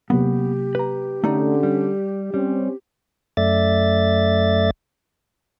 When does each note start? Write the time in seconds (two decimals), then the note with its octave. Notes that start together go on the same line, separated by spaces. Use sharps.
0.10 C3 F#3 A#3 B3 G4
0.75 B4 A#5
1.24 D3 A3 C#4 D#4 D5
1.63 G3
2.34 G3 C4 C#4
3.37 F#2 A3 D5 E5 A6